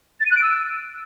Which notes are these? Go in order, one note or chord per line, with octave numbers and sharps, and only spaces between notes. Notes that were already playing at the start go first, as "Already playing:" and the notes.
A6
D#7
F#6
D7
E6